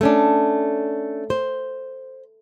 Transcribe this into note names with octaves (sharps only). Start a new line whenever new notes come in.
A3 C#4 D4
C5